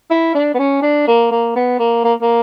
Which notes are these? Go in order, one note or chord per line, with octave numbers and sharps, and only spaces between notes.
E4
D4
B3
C#4
D4
A#3
A#3
B3
A#3
A#3
A#3